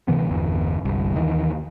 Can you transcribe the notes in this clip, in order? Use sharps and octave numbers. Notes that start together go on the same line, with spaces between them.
D2 C3 E3 B3
G1 E2
G1 C2
D#2 D#3 E3